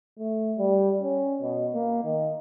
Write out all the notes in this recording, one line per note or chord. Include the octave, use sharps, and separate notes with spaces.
A3
G3
C#4
B2
A#3
D#3